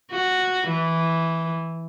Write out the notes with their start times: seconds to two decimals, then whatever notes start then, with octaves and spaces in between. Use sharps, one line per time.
0.12 F#4
0.68 E3